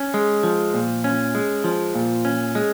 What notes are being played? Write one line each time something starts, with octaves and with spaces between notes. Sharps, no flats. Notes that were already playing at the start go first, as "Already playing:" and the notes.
Already playing: C#4
G#3
F3
A#2
C#4
G#3
F3
A#2
C#4
G#3